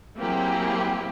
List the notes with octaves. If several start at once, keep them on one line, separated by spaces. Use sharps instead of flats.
F#3 A#3 C4 E4 G4 G#4